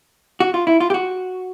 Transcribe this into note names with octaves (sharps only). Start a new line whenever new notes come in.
F#4
F4
E4
F4
G4
F#4